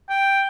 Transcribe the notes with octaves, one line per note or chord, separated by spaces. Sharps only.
G5